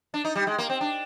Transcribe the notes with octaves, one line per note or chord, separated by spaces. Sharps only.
D4
D#4
G3
G#3
A#3
C4
D4